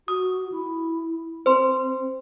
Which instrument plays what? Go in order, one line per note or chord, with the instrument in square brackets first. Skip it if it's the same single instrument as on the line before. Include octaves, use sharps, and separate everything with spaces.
[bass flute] F#4 [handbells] D#6
[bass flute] E4
[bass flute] C4 [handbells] C5 C6